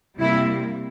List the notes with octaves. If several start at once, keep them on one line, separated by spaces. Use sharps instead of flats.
C3 G3 A#3 E4